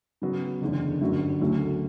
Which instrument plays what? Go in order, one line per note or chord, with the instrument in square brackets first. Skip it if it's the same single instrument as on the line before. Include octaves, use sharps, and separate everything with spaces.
[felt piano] C#3 F#3 B3
F#1 E2 D3
G1 F#2 D3 F#3
D2 C#3 F#3 A3